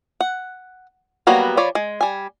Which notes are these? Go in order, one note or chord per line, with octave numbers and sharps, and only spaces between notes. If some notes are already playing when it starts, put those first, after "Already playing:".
F#5
F#3 G3 A#3 B3 F#4
F3 C#5 D5 B5
G#3
G3 G#5